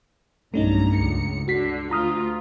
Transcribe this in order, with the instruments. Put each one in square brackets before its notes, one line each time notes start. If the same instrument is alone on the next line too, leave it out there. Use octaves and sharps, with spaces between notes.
[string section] B1 G2 A#5 [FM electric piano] A3 C#4 D#4
[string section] C#2 C#7
[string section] D3 [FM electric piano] F#4 B6 C7
[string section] D2 F4 [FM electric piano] A#5 D#6 F6